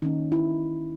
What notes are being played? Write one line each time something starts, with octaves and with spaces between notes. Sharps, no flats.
D#3 A#3 C#4 D#4
E4